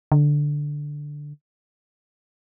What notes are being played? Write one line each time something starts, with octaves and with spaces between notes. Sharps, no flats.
D3